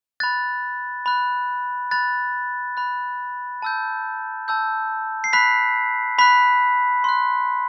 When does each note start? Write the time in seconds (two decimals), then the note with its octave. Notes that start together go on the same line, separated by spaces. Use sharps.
0.20 B5 F#6 A6
1.06 B5 F#6
1.91 B5 F#6 A6
2.77 B5 F#6
3.62 A5 E6 G6
4.48 A5 E6 G6
5.24 C7
5.33 B5 F#6 B6
6.18 B5 F#6 B6
7.04 C6 F#6